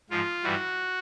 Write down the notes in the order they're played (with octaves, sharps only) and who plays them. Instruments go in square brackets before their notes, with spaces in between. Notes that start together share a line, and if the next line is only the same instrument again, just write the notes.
[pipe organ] G#2 F3 F4
G2 E3 G3 F#4